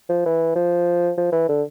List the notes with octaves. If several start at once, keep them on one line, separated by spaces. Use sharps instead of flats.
F3
E3
F3
F3
E3
D3